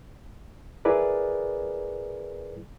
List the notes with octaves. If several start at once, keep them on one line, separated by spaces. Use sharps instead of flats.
E4 G#4 A#4 B4 D5